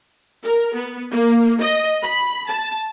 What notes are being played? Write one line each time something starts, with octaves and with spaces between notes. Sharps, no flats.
A#4
B3
A#3
D#5
B5
A5